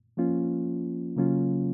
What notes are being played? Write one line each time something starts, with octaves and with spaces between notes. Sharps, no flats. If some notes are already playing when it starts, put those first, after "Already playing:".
F3 A#3 C#4 F4
C#3 F#3 A#3 C#4 F4